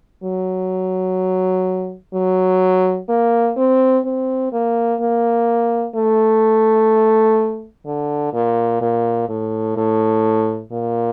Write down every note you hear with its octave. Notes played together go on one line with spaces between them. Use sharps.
F#3
F#3
A#3
C4
C4
A#3
A#3
A3
D3
A#2
A#2
A2
A2
A#2